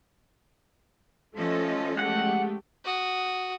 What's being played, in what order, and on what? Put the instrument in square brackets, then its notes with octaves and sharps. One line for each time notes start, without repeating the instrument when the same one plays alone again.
[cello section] F3 C#4 D#5 [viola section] A3 F4 A4
[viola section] G#3 A3 G4 [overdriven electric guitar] F#5
[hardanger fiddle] F#4 D#6